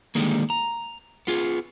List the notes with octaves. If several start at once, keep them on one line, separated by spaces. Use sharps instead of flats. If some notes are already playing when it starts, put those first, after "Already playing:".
D3 D#3 G3 G#3 A#3
A#5
B3 F4 G#4